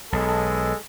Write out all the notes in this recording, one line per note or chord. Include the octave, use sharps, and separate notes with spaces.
B1 G#3 A4